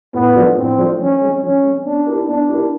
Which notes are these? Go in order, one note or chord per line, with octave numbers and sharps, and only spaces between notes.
A2 B3
F3 A3 D4 F4
A2 C4
F3 A3 D4 F4
F3 C#4
G#3 C4
F3 C#4
G#3 C4
B3 D4
E4 G4 A#4
B3 D4
E4 G4 A#4